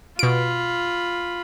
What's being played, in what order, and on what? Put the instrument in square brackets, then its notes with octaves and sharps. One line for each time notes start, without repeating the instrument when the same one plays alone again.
[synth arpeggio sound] B2 D7 [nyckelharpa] F4 B5